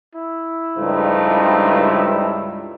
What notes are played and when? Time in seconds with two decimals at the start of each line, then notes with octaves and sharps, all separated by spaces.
0.15 E4
0.78 C#2 G2 F3 A3 D#4